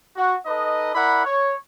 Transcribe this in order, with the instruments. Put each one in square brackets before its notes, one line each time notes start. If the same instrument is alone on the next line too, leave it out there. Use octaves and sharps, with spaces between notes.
[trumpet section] F#4
D#4 A4 B4 D#5
E4 A#4 D5 F#5 B5
C#5